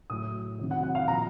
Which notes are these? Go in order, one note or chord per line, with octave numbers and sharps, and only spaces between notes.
A2 F#3 D#6
C3 D#3 F#3
F#5
F#5
F5
A#2 F3 A#5